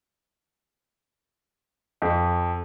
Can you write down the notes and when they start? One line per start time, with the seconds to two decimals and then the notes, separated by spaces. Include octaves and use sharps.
2.02 F2